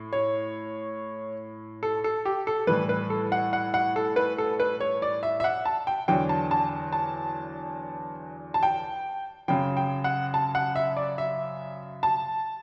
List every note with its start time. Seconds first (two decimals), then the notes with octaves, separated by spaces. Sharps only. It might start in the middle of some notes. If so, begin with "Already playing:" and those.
Already playing: A2
0.13 C#5
1.83 A4
2.04 A4
2.25 G4
2.47 A4
2.67 A2 E3 G3 B4
2.89 B4
3.10 A4
3.32 F#5
3.53 F#5
3.74 F#5
3.96 A4
4.16 B4
4.38 A4
4.60 B4
4.80 C#5
5.02 D5
5.23 E5
5.40 E5
5.44 F#5
5.65 A5
5.87 G5
6.08 E2 D3 F#3 G5
6.29 A5
6.51 A5
6.93 A5
8.54 A5
8.63 G5
9.48 F#2 C#3 F#3 G5
9.77 G5
10.04 F#5
10.34 A5
10.55 F#5
10.76 E5
10.97 D5
11.18 E5
12.03 A5